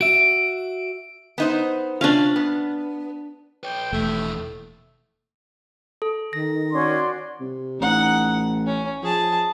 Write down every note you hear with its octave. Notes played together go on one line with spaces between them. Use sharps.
F#4 E5 D7
B3 D#4 C5
C3 C#4 D4 F4 F5
B3
B4 C#5 G5
E1 D#2 A2 A3
A4
D#3 A#6
C#4 F#4 D5 C6
C3
A1 D#4 F#5
C#4
F3 G#4 A5